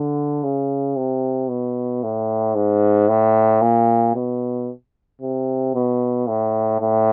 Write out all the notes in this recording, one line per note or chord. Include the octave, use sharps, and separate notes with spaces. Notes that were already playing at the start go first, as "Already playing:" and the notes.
Already playing: D3
C#3
C3
B2
A2
G#2
A2
A#2
B2
C3
B2
A2
A2